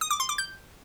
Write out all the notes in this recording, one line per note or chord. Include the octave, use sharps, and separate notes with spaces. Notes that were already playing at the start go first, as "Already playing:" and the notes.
D#6
D6
C6
D6
G6